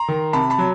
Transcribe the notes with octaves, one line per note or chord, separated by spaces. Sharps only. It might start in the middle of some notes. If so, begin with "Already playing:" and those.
Already playing: A#5 C6
D#3
C3 A5 B5
A5 B5
F#3